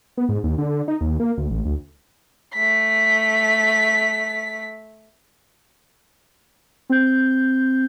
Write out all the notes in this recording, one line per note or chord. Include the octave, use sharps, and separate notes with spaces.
B3
G#2
D#2
D3
D#4
D#2
A#3
D2
A1
D2
A3 B6
C4 G6